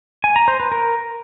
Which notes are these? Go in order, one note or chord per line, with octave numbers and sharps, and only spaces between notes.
G#5
A#5
C5
B4
A#4